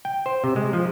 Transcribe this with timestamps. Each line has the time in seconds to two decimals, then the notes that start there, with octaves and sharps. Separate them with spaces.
0.05 G5
0.26 C5
0.44 C3
0.56 G#3
0.73 F3